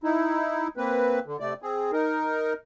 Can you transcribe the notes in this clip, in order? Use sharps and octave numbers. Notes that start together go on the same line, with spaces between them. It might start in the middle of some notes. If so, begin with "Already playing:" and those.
D#4 E4
A#3 C4 B4
D3
C3 A3 D5
C4 G#4
D#4 A#4